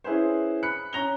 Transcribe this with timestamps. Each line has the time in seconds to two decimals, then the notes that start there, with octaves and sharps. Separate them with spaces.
0.04 C#4 E4 G#4 B4 C5
0.63 B5 F#6 C#7
0.93 C#4 A#5 A#6 F7 G7